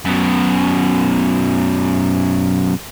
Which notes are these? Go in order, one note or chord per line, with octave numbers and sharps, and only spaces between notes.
F#2 B2